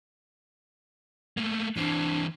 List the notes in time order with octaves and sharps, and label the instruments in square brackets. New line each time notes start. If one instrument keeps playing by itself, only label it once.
[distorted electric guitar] A3 A#3
[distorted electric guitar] E3 C4 [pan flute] D4